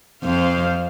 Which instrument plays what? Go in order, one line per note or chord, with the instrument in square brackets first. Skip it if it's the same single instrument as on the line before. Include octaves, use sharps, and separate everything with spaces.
[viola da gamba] F2 [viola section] C5 F5